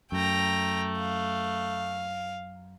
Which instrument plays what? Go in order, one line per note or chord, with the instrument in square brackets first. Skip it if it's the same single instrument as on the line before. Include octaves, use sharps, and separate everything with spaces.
[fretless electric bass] F#2 [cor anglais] A3 [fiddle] G5 A#5
[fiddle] F5